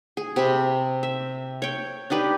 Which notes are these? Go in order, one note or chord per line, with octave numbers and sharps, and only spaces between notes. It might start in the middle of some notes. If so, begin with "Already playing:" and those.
G#4
C3 G4 E5 B5
E5
C#5 G5
D4 D#4 G4 B4